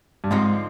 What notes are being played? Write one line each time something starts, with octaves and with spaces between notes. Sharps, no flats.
G2
G#2 D3 F3 C4 D#4